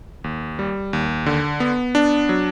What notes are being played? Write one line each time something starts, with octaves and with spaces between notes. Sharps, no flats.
D#2
G3
D#2
D3
B3
D4
F#3